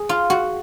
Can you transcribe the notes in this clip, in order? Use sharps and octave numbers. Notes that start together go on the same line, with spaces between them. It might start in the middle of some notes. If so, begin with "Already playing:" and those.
Already playing: G#4
F4
F#4